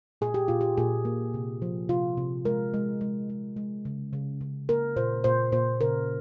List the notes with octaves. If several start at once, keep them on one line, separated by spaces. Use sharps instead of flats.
A#2 G#4
G4
A#2 F4
G4
A#2 G#4
A#3
C3
F3
C3 F4
C3
G#3 A#4
G#3
G#3
G#3
G#3
C#3
C#3
C#3
A#3 A#4
A#2 C5
A#2 C5
A#2 C5
C#3 A#4